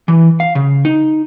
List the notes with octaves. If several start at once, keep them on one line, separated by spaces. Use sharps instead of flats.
E3
F5
C#3
D#4